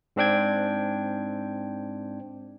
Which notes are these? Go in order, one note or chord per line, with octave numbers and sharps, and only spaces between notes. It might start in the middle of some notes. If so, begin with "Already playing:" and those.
G#2 C4 D4 G5 G#6